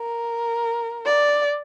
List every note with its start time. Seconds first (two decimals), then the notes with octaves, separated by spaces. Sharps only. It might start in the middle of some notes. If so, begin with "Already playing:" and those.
Already playing: A#4
1.06 D5